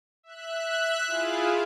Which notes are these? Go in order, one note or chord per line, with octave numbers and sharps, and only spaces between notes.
E5 F#6
E4 F4 G#4 F5